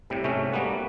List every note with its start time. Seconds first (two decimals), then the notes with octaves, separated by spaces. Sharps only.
0.10 A2 C3 G3
0.24 G#2 C3 A3 C#4
0.53 G3 A#3 B3 F#4